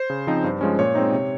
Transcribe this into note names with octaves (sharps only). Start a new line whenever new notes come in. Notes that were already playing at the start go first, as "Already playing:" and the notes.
Already playing: C5
C#3
F3 C4 D#4
G2
F3 G#3 C#4
A#2 C#5
G#3 C4 D#4
C3